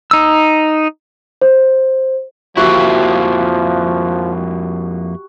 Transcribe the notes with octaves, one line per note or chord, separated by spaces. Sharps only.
D#4 E6
C5
F2 F3 A#3 E4 F#4 G4 E5